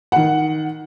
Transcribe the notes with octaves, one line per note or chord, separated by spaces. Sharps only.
D#3 F#5